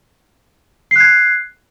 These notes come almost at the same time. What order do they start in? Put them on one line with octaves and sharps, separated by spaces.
C7 F#6 G#6